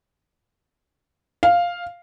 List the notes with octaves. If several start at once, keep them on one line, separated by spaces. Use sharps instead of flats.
F5